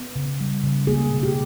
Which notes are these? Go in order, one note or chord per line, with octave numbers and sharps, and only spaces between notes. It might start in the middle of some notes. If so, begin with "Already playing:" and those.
Already playing: B3
C#3
G3
C#3
A#3 G#4
B2
G4